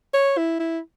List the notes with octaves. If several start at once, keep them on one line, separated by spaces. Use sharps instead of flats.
C#5
E4
E4